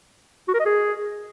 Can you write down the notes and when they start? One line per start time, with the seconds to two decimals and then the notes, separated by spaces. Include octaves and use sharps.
0.48 F#4
0.54 A#4
0.60 D#5
0.65 G#4